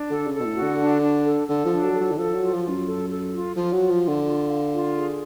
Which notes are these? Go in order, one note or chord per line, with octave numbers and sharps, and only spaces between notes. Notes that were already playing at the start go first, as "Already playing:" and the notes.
Already playing: D4
D3 A4
C#3
A4
B2
A2
F#4
D3
D4
D4
A4
D3 A4
F3
D4
F#3
A4
F#3
D3
F3 A4
F#3
F4
F3
F4
F#2
A4
A4
F4
F3 F4
F#3
F4
F3
F4
D3
F4
F5
F4
G#4